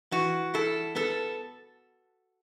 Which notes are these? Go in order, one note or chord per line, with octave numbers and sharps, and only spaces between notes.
E3 F#4
E4 A4
B3 A4